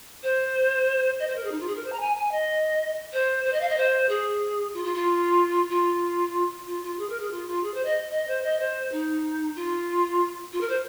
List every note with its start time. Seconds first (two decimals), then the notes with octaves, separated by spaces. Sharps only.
0.23 C5
1.19 D#5
1.27 C5
1.36 A#4
1.44 G#4
1.51 D#4
1.60 F4
1.67 G#4
1.75 A#4
1.83 C5
1.92 A#5
2.00 G#5
2.16 G#5
2.31 D#5
3.12 C5
3.44 C5
3.53 D#5
3.60 F5
3.69 D#5
3.77 C5
4.09 G#4
4.74 F4
4.84 F4
4.94 F4
5.69 F4
6.66 F4
6.82 F4
6.98 G#4
7.09 A#4
7.20 G#4
7.30 F4
7.47 F4
7.63 G#4
7.74 C5
7.85 D#5
8.11 D#5
8.27 C5
8.43 D#5
8.59 C5
8.92 D#4
9.55 F4
10.52 F4
10.60 A#4
10.69 C5